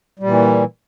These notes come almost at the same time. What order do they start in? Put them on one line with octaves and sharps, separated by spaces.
G3 A#2 E3